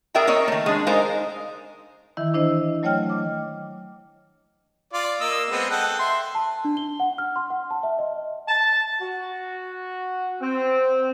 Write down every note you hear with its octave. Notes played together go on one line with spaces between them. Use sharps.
G#4 A#4 D5 E5 G5 A#5
A#3 A#4 C#5 D#5
D#3 A3
G#3 D4
G#3 D#4 A#4 C5 F5
D#3 E3 E4 E5
D4 E4 C5 D#5
F#3 A3 C#5 D#5 G5 F6
D6
F4 D5
A#3 D#5 E6
G#3 B3 C4
A4 F#5 G5
E5 C6
A5
D4
G7
F#5
F6
C6
F#5
A5
E5
D#5
A5
F#4
C4